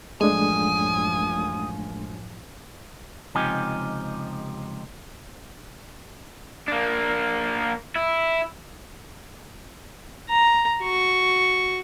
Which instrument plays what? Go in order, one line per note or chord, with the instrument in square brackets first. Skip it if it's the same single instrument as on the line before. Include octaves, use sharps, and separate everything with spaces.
[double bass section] A1 F#2 F3 [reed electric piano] G#3 A3 D4 [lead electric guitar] G#5 [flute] D#6
[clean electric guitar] C#2 C3 F3 D#4 G4 G#5
[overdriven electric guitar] A#3 D4
E4
[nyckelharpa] A#5
F#4 C#6